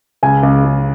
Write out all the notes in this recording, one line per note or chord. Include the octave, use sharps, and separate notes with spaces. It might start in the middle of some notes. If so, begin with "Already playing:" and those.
C#2 G#5
C#2
C#3